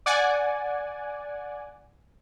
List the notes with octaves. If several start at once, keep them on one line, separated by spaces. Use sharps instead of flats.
D5 F#5 G#5